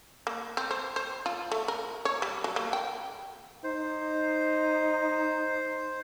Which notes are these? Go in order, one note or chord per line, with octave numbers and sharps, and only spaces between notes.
A#3
C4
C5
C5
F4
A3
A#4
C#5
G3
F#3
A#3
G5
D#4 C5